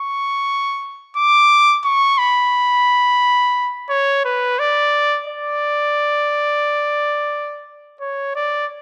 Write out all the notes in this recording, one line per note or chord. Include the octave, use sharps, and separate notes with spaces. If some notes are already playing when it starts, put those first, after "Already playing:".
Already playing: C#6
D6
C#6
B5
C#5
B4
D5
D5
C#5
D5